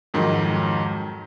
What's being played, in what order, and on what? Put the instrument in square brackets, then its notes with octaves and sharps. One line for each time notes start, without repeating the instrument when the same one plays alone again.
[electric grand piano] F2 G#2 D#3 F#3